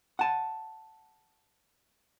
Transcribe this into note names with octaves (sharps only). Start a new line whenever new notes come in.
F#5 A5